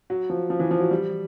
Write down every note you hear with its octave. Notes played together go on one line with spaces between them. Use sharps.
F#3
F3
F3
E3
F3
F#3
G3